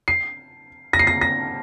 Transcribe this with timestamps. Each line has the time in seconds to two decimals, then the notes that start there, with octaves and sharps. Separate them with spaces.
0.08 C7
0.93 A#6
0.99 C7
1.07 A#6
1.21 A#6